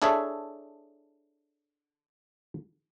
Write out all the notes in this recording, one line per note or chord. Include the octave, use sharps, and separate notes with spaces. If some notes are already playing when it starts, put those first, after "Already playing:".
D4 E4 G#4 A4 C#5 E5